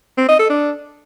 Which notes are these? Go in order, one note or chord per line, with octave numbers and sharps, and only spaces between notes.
C4
D#5
A4
D4